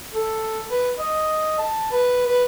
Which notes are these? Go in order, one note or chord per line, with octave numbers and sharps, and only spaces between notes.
A4
B4
D#5
A5
B4
B4